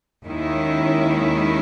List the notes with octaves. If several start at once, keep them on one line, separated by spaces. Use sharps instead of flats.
D#2 D#3 G#3 C#4 E4